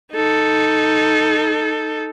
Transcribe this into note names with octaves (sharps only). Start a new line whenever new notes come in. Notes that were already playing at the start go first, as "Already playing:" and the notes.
D#4 A4